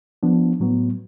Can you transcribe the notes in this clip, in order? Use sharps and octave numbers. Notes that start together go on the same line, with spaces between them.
F3 B3 D4
A2 F#3 B3